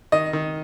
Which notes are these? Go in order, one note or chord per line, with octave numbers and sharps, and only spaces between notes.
D#3 D#5
D#3